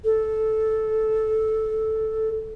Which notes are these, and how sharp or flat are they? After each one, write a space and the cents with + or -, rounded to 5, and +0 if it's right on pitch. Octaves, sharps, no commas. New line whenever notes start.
A4 -5